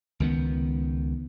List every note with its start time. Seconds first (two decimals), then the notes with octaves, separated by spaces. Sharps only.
0.20 C#2 D#3 B3